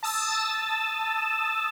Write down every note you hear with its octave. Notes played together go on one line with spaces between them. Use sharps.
A5 D#6 E6 A6